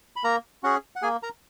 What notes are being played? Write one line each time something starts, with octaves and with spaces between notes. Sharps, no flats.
B5
A#3 A#4 A#5
C#4 F#4 G#4 F#5
F#5
A#3 G#4 G#5
A#4 A#5